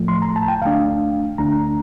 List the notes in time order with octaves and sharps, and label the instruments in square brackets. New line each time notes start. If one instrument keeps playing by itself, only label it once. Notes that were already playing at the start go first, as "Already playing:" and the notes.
Already playing: [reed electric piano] A2 F3 A3
C6
A#5
A5
G5
D2 D3 A3 D4 F5
D2 D3 A3 D4 A#5